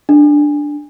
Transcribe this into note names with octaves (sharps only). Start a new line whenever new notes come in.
D4